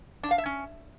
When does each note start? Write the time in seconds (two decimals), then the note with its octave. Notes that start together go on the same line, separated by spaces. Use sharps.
0.23 D4
0.31 F5
0.38 E5
0.46 C#4